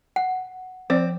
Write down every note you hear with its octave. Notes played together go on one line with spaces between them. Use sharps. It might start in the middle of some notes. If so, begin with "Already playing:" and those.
F#5
F3 C4 D5